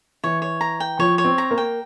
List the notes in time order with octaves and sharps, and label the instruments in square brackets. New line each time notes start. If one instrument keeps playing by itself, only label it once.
[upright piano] E3 [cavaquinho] C#5
[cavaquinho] C#5
A#5
G5
[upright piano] F3 [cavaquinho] C#5
[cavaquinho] C#5
[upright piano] C4
[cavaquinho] A#5
[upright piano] A#3
[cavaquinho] G5